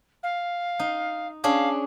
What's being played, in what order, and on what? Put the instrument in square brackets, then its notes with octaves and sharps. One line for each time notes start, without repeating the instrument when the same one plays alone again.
[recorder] F5
[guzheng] D#4
[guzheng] C#4 D4 G#4 [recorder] F5